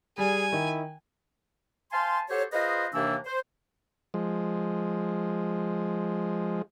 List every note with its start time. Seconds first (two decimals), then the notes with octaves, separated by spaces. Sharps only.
0.18 G3 G#4 G#5
0.52 D#3 E4
1.92 C5 F5 G#5 A5 C6
2.29 F#4 G4 A4 C5 C#5
2.53 F4 G#4 B4 C5 D#5
2.94 D#2 C3 E3 A#3 D4 E6
3.25 C5
4.14 F3 G#3